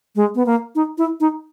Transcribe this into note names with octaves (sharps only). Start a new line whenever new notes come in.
G#3
B3
A#3
D#4
E4
D#4